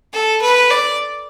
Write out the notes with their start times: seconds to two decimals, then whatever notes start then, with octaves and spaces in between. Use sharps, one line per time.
0.13 A4
0.42 B4
0.71 D5